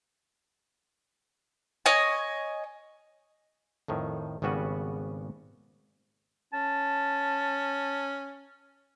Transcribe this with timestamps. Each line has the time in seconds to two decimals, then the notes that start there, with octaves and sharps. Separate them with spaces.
1.86 C#5 D#5 G#5
3.88 F2 A2 D#3
4.42 G#1 C#3 G3 B3 F#4 B4
6.53 C#4 A5